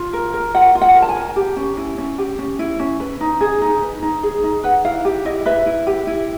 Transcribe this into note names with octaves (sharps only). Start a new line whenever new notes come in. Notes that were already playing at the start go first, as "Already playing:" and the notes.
Already playing: F4
A#4
A#4
F4 F#5
F4
F#5
A#4
A5
G#5
A#4
G4
C#4
E4
C#4
G4
C#4
E4
C#4
B4
D#4
G#4
D#4
B4
D#4
G#4
D#4
B4 F#5
E4 F5
G4
E4 D#5
B4 E5
E4
G4
E4